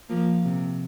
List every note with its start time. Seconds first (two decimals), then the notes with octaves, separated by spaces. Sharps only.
0.09 F3 A#3
0.45 C3